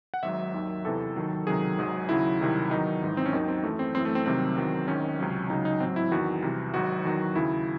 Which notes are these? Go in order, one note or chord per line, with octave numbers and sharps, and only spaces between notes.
F#5
G#1 G#2 F#3 E5
D#2 D#3 F#3
E2 C3 E3 A4
D#2 D#3 F#3
C#2 C3 D#3 F#3 G#4
G#1 G#2 F#3
D#2 C#3 F#3 E4
C2 C3 D#3 F#3
E2 D#3 F#3 D#4
G#1 G#2 E3
C4
C#4
D#2 D#3 F#3 D#4
C4
F#2 E3 A3
C4
F#2 E3 C4
A3
C4
C2 C3 D#3 F#3 C4
E2 D#3 F#3
G#1 G#2 D#3 C#4
C#2 C3 F#3
C#2 C#3 F#3 D#4
D#4
A1 G#2 F#3 C4
E4
E2 D#3 F#3 F#4
C2 C3 E3
G#1 G#2 F#3 F#4
E2 D#3 F#3
D#2 C#3 F#3 E4